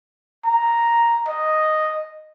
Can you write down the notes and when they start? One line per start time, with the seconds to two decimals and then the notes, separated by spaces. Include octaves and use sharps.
0.45 A#5
1.27 D#5